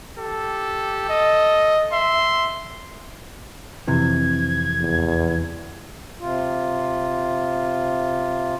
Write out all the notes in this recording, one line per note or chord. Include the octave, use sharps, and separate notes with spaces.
G4 A4
D#5
E5 C6
F2 C3 E3 G#6
E2
C3 F4